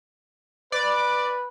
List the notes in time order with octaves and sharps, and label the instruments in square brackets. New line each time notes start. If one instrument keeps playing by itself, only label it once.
[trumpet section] B4 [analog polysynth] D5